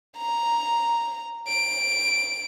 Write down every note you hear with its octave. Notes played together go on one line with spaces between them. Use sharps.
A#5
D7